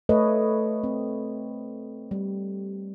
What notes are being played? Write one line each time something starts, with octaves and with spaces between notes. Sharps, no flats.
A3 A4 B4 C#5 D#5
C4
G3